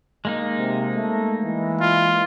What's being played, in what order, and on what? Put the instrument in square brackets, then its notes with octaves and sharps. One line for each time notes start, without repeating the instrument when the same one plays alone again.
[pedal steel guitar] G#3 A#3 D#4
[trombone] C3
A3
E3
[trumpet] F4